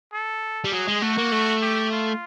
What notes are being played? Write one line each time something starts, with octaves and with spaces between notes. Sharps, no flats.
A4
G3
F#3 G#4
G#3
A3 F#4
A#3
A3
G4
F4